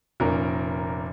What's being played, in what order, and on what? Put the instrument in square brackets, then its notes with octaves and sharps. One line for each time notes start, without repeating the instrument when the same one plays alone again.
[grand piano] F1 A#2 C#4 A#4